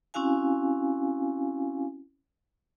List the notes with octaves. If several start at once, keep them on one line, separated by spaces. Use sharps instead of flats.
C4 C#4 E4 F#4 F5 G#5